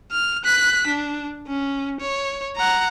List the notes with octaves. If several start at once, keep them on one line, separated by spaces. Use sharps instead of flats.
F6
F#6 B6
D4
C#4
C#5
F#5 A#5